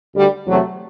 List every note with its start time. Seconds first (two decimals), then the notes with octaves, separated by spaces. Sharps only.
0.13 D2 D3 G3
0.45 E2 C3 F#3 A3